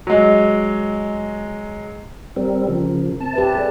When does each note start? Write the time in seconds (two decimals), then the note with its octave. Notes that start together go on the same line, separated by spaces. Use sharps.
0.07 F#3 G#3
2.36 G3 C4 A#4
2.68 C#3 F3
3.20 C4 A5
3.34 G4 B4 E5
3.55 G#4 A4 D5